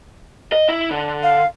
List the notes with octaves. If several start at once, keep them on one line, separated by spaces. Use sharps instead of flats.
D#5
E4
D3
F5